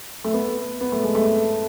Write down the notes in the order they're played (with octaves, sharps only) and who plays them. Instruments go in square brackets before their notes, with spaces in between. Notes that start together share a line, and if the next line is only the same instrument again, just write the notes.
[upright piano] A3
B3
B3
A3
G#3
A3